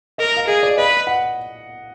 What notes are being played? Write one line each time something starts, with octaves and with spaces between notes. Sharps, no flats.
A#4 D#5
F5
G#4 D#5
D5
B4 D#5
F#5